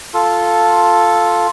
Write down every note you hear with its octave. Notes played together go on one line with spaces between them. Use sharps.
F4 A4